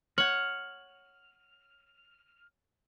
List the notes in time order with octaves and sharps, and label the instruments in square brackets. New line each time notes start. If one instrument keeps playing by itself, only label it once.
[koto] C#5 F#5 [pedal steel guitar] F6 [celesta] F#7